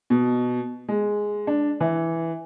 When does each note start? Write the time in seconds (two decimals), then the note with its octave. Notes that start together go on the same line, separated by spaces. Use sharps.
0.10 B2
0.89 G#3
1.47 D4
1.80 E3